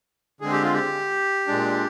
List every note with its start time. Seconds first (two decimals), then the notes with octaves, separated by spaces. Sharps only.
0.41 D3 G#3 C4 G#4
0.52 G4
0.63 F4
0.74 G4
1.48 A#2 G#3 D4